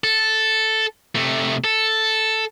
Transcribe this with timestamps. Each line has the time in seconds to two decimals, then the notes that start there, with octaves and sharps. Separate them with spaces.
0.04 A4
1.15 C3 A3
1.64 A4